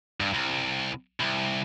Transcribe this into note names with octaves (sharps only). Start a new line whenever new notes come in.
G2
C2
C2